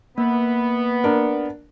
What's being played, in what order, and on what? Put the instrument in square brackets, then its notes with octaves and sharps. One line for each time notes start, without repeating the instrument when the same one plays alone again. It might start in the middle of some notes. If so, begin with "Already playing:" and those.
[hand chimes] A#3 [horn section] B3
[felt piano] D4 A#4